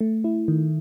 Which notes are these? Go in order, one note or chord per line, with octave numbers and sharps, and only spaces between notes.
A3
E4
D#3